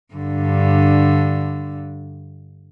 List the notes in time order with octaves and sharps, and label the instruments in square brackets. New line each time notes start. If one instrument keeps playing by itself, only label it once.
[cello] G2 D3